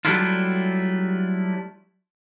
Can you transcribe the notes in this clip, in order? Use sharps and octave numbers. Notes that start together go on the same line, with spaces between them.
F#3 G3 A3 D4 E4 F4